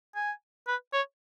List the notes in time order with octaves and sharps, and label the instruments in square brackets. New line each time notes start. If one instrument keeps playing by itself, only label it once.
[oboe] G#5
B4
C#5